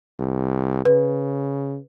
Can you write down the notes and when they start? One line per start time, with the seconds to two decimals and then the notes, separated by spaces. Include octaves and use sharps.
0.19 C2
0.85 C#3 B4